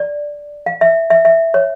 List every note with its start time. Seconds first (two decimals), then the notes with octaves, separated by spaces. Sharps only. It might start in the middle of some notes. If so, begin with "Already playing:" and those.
Already playing: D5
0.66 F5
0.81 E5
1.10 E5
1.25 E5
1.54 C#5